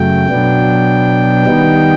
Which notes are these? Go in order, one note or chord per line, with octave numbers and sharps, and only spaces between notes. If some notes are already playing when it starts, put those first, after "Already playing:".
Already playing: F#2 C#3 F#3 A3 G5
B2 F#3 B3 D4
D#3 G3 B3 D#4